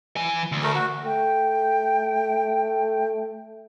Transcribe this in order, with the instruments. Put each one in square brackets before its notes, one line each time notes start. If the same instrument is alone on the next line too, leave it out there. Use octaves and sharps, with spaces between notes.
[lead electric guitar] E3 G#5
D2
[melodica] A3 A#4
F#4
[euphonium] A3 [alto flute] G5